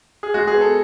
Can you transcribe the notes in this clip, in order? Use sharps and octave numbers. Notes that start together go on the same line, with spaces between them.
G#4
G#3 F#4
G#4
B3
A4